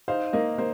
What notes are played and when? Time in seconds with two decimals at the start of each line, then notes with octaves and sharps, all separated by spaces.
0.08 D#4 C5 F5
0.33 A#3 D#5
0.58 A#3 C5